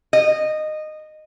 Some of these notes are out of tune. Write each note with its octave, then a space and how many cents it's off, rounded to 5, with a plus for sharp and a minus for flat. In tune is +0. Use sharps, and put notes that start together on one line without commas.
D#5 -15